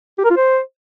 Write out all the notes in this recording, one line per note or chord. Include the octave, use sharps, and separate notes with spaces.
G4
A#4
F4
C5